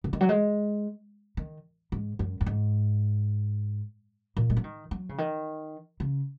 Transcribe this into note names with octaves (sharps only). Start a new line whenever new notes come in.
C#3
D#3
F#3
G#3
D#3
G#2
F#2
F#2
G#2
A#2
G#3
F#3
D#3
F#3
C#3
D#3
C#3